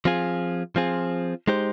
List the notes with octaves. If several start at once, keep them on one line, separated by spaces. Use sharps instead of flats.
F3 C4 F4 G#4
F3 C4 F4 G#4
G#3 D#4 G4 C5